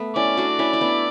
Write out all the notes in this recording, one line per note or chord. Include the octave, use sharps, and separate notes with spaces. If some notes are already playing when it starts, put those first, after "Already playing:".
Already playing: A3 B3
C#4 E4 D5
D4 F#4
C#4 E4
E4
B3 D4